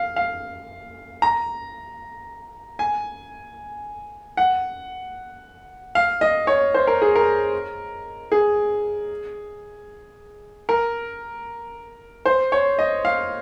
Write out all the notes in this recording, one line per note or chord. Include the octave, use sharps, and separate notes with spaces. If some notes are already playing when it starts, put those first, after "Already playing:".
Already playing: F5
F5
A#5
G#5
F#5
F5
D#5
C#5
C5
A#4
G#4
A#4
G#4
A#4
C5
C#5
D#5
F5